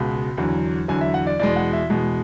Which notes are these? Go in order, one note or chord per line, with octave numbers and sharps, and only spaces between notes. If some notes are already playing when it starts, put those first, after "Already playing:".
Already playing: C#2 B2 G#3 B5
E2 D3 F#3
E2 D3 F#3 G#5
E5
F#5
D5
E2 B2 G#3 D5
F#5
E5
E2 B2 G#3